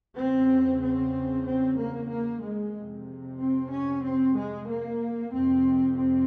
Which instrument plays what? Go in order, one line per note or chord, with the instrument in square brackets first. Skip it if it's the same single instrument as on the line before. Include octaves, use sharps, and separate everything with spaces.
[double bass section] E2 C#3 C4
C4
C4
A#3
A#3
G#3
F2 C3
C4
C#4
C4
G#3
A#3
F2 C3 C4
C4